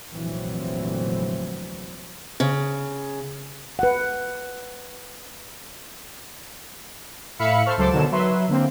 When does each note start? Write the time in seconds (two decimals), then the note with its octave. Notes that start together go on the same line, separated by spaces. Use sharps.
0.11 F1 A#1 D3 E3 F#3 C4
2.40 C#3
3.79 B4 F#5
7.39 A2 E5 F5 B5 C#7
7.66 A4 C5 C#6 F6
7.78 C#2 F#3 A4 C5 C6 D6
7.91 B2 D3 D#3 F#3 E7
8.11 F#3 B4 E5 C6
8.48 D3 A#3 C4